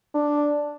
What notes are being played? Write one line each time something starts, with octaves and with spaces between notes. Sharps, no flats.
D4